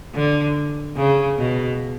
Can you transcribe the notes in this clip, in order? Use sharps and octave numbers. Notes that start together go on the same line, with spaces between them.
D3
C#3
B2